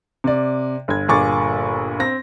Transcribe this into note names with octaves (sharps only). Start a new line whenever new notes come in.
C3 D5
G1 G#6
G1 A#2 G#4 C#6 D6 A6
C4 A#6